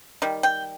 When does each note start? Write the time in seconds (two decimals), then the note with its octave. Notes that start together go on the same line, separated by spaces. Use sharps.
0.22 D#3 G3
0.43 G5